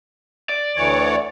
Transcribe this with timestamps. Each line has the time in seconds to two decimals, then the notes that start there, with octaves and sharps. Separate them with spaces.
0.49 D5
0.76 D2 E3 C#5